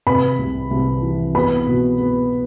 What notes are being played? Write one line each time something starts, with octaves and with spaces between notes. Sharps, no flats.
C3 B4 B5
C2
C2
E3
B3 B4 B5
B2
B3